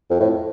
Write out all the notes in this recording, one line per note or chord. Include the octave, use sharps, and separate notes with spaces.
F2
A2